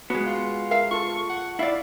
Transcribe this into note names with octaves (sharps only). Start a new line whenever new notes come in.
G#3 B3 F#4
F4
A#4 E5 F5
F4 A4 C#6
F#5
E4 D5 E5 F5